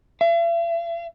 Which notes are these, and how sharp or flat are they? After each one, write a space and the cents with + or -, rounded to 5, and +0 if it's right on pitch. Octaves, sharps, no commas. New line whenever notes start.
E5 +45